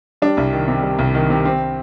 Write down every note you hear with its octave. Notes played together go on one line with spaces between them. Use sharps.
G3 D4
C2
D#3
C3
G3
C2
D#3
C3
C4